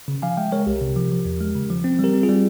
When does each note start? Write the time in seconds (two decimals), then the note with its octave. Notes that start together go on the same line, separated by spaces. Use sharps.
0.08 C#3
0.22 F3 F5 G#5
0.37 G#3 E5 G5
0.52 G#3 A#4 C#5
0.67 C2 G4 A#4
0.81 C3
0.96 F3
1.11 F3
1.25 E2
1.40 G#3
1.55 C#3
1.70 F3
1.84 C4
1.99 G3 G4 A#4
2.14 C4
2.23 F4 G#4
2.29 G3